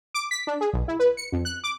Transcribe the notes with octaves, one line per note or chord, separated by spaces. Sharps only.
D6
B6
D4
G#4
B1
E4
B4
C#7
F2
F#6
D6